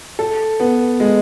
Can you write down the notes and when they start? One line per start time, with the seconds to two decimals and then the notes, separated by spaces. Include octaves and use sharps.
0.19 A4
0.60 B3
1.00 G#3